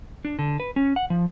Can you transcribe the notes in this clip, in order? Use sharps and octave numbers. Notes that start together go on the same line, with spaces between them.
D4
D3
B4
C#4
F#5
F3